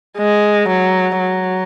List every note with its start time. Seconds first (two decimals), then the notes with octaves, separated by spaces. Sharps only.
0.18 G#3
0.68 F#3
1.19 F#3